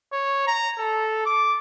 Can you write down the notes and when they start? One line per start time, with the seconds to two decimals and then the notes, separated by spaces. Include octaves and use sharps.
0.12 C#5
0.47 A#5
0.78 A4
1.26 D6